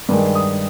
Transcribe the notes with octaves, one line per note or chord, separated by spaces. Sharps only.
G2 D#3 G#3
D#6